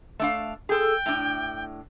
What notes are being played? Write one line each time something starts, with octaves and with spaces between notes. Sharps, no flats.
A3 D4 F5
G#4 A4 G5
A2 D4